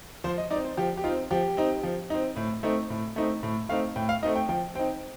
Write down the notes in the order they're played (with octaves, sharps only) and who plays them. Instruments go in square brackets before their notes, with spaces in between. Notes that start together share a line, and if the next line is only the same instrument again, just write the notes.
[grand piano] F3 C5
D#5
D#4 D5
C4
C5
F3 G4
G4
D#4 F4
C4
F3 G4
C4 D#4
F3
C4 D#4
A2
A3 C4 D#4
A2
A3 C4 D#4
A2
A3 C4 D#4 F5
A2 G5
F5
A3 C4 D#4 D#5
G5
F3 G5
C4 D#4 G5